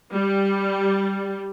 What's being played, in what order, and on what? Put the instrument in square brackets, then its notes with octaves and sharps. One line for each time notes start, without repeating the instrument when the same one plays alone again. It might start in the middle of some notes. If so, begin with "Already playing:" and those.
[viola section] G3